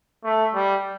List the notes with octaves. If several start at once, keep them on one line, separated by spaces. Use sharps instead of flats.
A3
G3